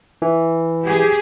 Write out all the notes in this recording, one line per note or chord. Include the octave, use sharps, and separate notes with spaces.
E3
G4 G#4